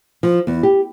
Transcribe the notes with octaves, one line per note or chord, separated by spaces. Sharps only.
F3
E2
G4